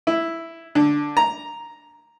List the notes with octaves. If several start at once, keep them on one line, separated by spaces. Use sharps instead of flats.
E4
D3
A#5